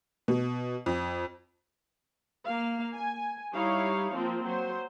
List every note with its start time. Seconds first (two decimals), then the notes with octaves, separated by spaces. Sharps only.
0.28 B2
0.86 F2
2.44 A#3 F5
2.94 G#5
3.54 G3 D#4 E4 C#5 F5
4.13 F3 A#3 C4 F4
4.45 F#3 C5